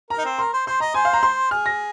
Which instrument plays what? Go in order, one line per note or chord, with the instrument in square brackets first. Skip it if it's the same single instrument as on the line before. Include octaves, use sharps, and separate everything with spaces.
[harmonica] A#4 [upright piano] A#5
[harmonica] D#4
C4
[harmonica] A#4 [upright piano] C6
[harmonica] C5
[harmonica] C5 [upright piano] C6
[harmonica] D#5 [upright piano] A#5
[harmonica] C5 [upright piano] G#5
[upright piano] F5
A#5
C6
[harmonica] G#4 [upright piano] F6
[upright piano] A#6